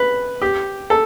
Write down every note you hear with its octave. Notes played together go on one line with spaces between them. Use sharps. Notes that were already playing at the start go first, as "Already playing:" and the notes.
Already playing: B4
G4
A4